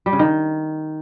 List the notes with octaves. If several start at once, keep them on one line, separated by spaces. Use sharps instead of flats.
G3
C#3
D#3